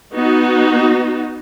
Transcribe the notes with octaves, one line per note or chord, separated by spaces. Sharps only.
B3 D#4 F#4